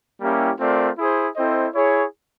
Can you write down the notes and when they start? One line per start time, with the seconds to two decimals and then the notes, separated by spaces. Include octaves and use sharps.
0.21 G3 A#3 C#4 E4 G4
0.60 A3 C4 F4 A#4 D5
0.98 E4 G#4 C5
1.36 C4 E4 A4 C5 D#5
1.75 E4 G#4 C#5